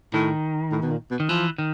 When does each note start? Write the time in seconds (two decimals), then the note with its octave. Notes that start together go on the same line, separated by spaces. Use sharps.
0.14 A2 D#3
0.72 A2
0.82 B2
0.91 A#2
1.11 B2
1.20 D#3
1.29 E3 F3
1.58 D#3